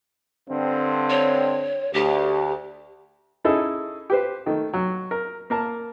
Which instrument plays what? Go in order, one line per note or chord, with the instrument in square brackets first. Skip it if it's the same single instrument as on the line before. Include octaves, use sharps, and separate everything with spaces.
[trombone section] G2 D3 C4
[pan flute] C#5
[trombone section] D2 [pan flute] G4
[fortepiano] C#4 D#4 E4 G#4 A4
G4 B4 C5
D#3 A3
F#3
A#4
A#3 A#4 A5